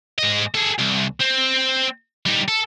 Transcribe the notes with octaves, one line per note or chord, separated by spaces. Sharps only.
G#2 D#5
G#4 A4
C2
C4
G3 D#4
A4